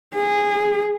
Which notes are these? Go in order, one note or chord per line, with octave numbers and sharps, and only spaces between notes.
G#4